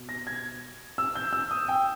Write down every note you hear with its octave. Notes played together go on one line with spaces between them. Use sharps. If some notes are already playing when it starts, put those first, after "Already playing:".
Already playing: B2
A#6
G#6
E6
G6
E6
D#6
G5